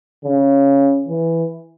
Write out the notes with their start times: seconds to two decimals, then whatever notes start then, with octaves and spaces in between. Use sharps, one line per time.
0.25 C#3
1.08 E3